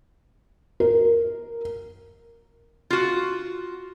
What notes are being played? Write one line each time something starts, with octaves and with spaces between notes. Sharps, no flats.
A#4
F4 F#4